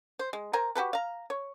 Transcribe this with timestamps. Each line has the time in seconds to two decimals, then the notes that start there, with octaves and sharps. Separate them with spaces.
0.19 C5
0.33 G#3
0.53 A#4 C5 G#5 A#5
0.75 F#4 G4 A4 B4
0.93 F5 A#5
1.30 C#5